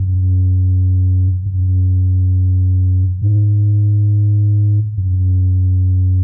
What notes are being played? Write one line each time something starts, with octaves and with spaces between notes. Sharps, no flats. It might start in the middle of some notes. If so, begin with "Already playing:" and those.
Already playing: F#2
F#2
G#2
F#2